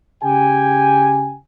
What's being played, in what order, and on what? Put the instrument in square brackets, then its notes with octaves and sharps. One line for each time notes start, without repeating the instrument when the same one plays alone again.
[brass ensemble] C#3 G4 G5 G#5